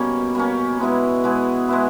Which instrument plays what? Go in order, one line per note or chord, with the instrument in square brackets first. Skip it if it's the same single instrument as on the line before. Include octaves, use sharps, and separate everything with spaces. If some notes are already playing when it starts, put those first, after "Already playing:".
Already playing: [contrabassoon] B2 [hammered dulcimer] G3 A#3 C#4
[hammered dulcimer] G3 A#3 C#4
[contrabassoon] B2 [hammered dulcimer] G#3 B3 E4 G#4
[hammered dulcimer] G#3 B3 E4 G#4
G#3 B3 E4